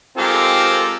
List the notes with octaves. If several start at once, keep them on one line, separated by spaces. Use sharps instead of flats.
G#3 C4 F4 G4 A4 A#4